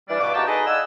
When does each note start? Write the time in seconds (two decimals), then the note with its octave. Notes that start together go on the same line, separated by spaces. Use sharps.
0.09 E3 G3 D4 D5
0.20 G2 B2 D6
0.34 E2 A#3 D#4 F#4 G4 A5
0.47 D#4 G#4 A4 B4 D#5
0.66 D5 D#5 F5 F#5 G#5 E6